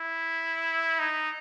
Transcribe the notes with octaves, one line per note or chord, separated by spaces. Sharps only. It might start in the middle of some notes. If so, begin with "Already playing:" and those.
Already playing: E4
D#4